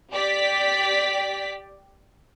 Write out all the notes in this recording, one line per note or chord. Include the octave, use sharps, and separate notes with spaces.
G4 D5 B6